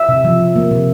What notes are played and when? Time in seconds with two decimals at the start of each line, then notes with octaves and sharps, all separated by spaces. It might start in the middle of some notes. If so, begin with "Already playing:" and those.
Already playing: E5
0.09 C3
0.24 F3
0.40 C3
0.56 A#3
0.71 C3